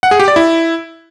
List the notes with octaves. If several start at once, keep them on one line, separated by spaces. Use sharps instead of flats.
F#5
G#4
G4
D5
E4